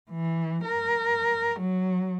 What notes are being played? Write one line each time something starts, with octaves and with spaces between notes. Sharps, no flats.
E3
A#4
F#3